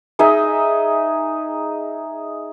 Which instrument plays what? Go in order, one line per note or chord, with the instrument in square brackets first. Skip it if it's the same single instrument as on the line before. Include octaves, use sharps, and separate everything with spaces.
[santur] D#4 G#4 D#5 E5